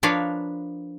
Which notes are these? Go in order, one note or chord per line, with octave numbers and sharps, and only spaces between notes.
F3 D4 A#4 B4 C#5 F5